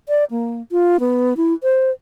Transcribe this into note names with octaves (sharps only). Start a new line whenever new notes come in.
D5
A#3
F4
B3
E4
C5